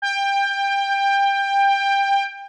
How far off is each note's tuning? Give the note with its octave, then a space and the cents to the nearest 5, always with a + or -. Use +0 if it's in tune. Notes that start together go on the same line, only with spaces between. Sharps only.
G5 +20